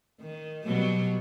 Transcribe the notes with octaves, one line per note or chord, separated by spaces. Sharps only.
D#3
B2 F#3 G3